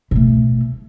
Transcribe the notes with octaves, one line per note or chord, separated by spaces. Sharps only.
B2 A3